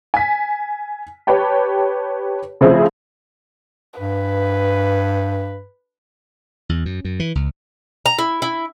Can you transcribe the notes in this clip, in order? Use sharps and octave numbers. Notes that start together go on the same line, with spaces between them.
G#5 B6
G4 B4 C#5 G5 A5
C#3 F3 A3 C4 E4 G#4
G2 B4
E2
F#2
F#2
E3
C#2
A#5
E4
E4